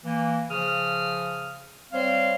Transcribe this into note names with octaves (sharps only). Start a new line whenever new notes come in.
E3 A#3
C#3 F3 D#6 F6
G3 C4 C5 C#5 F5